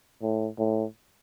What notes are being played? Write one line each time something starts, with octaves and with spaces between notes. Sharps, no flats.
A2
A2